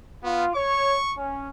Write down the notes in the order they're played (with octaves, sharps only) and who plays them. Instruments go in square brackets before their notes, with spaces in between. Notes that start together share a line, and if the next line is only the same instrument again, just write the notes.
[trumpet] B3 [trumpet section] F4
[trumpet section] C#5 [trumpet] C#6
[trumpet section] C#4